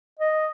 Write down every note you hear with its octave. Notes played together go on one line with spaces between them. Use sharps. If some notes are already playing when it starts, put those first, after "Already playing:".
D#5